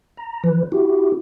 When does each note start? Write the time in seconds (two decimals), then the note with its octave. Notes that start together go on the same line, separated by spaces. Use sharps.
0.17 A#5
0.44 E3 F3 B4
0.72 E4 F#4 G4